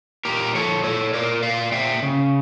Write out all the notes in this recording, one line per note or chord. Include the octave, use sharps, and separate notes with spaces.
A#2 G4 A#4
F3 A4 C#5
A#2 A4 C#5
A#2 A#4 D5
A#2 D5 F5
A#2 E5 G5
C#3